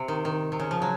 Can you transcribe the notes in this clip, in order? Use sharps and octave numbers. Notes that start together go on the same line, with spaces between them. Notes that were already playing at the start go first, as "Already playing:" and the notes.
Already playing: C3
D#3
D#3
C3
C#3
F3
F#3